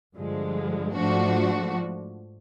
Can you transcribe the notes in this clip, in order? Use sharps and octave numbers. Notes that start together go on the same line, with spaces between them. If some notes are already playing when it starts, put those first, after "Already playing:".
G2 D3 F3 G#3
G#2 F3 A3 D4 F#4